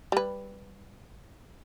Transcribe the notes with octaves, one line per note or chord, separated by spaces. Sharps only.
G3 B4